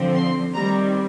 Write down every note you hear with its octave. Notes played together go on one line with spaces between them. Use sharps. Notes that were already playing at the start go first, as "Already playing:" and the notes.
Already playing: D3 F3 C4
C6
D#3 G3 C4 A#5